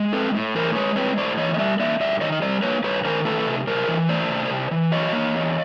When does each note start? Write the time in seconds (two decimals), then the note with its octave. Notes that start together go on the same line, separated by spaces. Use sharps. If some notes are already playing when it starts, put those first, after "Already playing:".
Already playing: G#3
0.13 C4 A4 B4
0.34 A2
0.55 E3 A#4 C5
0.75 G#3 B4 C#5
0.96 C4 B4 C#5
1.17 A2 C5 D5
1.38 E3 C#5 D#5
1.54 D#5
1.58 G3 D5 E5
1.80 A#3 D5 E5
2.00 G2 D5 E5
2.21 D#3 C#5 D#5
2.32 D#5
2.42 G3 C5 D5
2.62 A#3 B4 C#5
2.84 G2 B4 C#5
3.05 D#3 A#4 C5
3.25 A3 A4 B4
3.46 C3
3.67 C3 A#4 C5
3.88 E3
4.09 A3 C5 D5
4.29 C3
4.50 C3
4.71 E3
4.91 F#3 C#5 D#5
5.13 A#3
5.34 E2